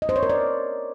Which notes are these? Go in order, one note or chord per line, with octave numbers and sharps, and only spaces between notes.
D#5
C5
C#5
A#4
D5